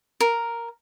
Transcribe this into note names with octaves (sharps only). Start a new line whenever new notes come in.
A#4